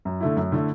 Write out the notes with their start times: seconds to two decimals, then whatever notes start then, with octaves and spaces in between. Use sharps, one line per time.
0.05 F#2
0.21 D3 A3 E4
0.37 F#2
0.52 D3 A3 E4